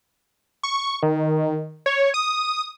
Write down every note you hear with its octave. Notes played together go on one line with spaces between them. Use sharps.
C#6
D#3
C#5
D#6